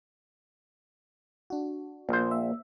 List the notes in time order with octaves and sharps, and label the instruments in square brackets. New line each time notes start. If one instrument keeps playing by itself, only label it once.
[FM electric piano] D4 F#4
[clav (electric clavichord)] A#1 C5 [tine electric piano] A#3
[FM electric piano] E5